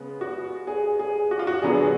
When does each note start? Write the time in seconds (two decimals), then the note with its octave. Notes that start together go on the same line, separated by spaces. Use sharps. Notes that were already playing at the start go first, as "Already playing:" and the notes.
Already playing: C#3 G#3 B3
0.21 F#4
0.67 G#4
0.99 G#4
1.31 F#4
1.39 F4
1.47 F#4
1.62 D3 F#3 B3 G#4